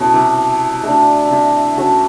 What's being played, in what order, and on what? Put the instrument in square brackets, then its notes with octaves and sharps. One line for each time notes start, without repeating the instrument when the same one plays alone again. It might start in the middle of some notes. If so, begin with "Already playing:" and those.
Already playing: [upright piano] B2 [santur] C#4 E4 A4
[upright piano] C3
[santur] A3 D4 F#4
[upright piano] C3
[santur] C#4 F#4 A4